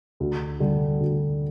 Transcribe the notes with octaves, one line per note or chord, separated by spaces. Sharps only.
D2
D3 G3
D2